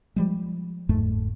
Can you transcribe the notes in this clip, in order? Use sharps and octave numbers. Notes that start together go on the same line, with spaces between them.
F3 G3 G#3
F#1 E2 G#2 A3